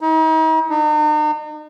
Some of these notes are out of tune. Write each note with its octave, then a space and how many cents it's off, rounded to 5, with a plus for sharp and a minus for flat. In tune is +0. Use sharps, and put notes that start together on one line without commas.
D#4 +40
D#4 -40